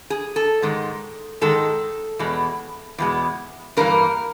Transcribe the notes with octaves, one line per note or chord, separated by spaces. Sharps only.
G#4
A4
G#2 D#3 G#3
G#2 D#3 G#3 A4
E2 B2 G#3
E2 B2 G#3
G2 E3 G3 A#3 A#4